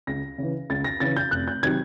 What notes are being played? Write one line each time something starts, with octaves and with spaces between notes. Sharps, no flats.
C#2 A#6
C#3 E3
C#2 A6
A#6
C#3 E3 A6
G6
F1 F#6
G6
C3 D#3 F#3 G#6